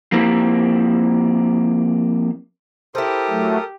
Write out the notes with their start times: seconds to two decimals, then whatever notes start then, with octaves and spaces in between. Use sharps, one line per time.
0.12 F3 A#3 C4 E4 G4
2.95 E4 G4 A4 A#4 C5 D#6
3.29 F#3 A3